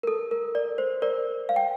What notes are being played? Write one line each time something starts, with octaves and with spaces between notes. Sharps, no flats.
A#4
A4
A#4
A#4 D5
C5
A#4 D5
F5
G5